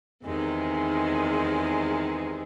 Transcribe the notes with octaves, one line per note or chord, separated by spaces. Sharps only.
E2 C3 D#3 G#3